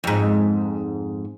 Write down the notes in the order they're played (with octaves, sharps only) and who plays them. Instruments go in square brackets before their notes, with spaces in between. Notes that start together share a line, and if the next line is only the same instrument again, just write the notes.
[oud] F2 G#2